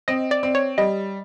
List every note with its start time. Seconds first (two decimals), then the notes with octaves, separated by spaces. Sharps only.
0.08 C4 D#5
0.31 D5
0.43 C4
0.55 C#5
0.78 G3 D#5